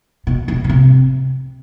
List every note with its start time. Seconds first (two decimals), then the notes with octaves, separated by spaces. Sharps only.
0.27 B2
0.48 B2
0.64 B2
0.69 C3